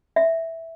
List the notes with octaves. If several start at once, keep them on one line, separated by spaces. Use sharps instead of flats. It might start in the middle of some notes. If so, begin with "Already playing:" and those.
E5